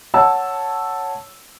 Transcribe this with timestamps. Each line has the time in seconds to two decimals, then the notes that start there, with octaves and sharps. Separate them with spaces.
0.14 C#5 F#5 A5 E6